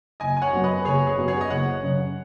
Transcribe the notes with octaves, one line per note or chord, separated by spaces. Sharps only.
F#1 D#5 G#5
G#5
C#5 F#5
F#2 F#3 B3
B4 D#5
F#1 G#4 C#5
G#4 C#5
F#2 F#3 B3
G#4 C#5
D#5
F#1 C#5 F#5
F#2 C#3 F#3